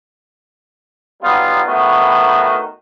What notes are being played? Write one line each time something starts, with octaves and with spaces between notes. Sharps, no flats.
F#3 G3 B3 D#4 F4
A2 D#3 B3 F#4